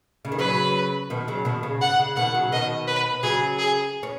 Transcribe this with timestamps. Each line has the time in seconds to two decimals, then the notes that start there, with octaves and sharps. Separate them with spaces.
0.25 C#3
0.32 D#3
0.38 C#3 F#3 B4
1.10 B2 D#3
1.28 C#3 F#3
1.45 B2 D#3
1.63 C#3
1.81 G#2 F#5
1.99 C#3
2.16 B2 D#3 F#5
2.34 C#3 F#3
2.52 B2 D#3 D#5
2.87 B4
3.23 C#3 F#3 G#4
3.58 G#4
4.03 C#4